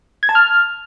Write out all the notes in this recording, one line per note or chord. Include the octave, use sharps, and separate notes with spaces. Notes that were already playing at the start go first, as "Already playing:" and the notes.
G#6
A5
F6